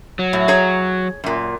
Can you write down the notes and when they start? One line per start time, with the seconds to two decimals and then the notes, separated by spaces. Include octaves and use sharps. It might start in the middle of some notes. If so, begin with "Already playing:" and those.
0.19 F#3
0.33 A2
0.48 G#4 C#5 A#5
1.24 F#2 A#2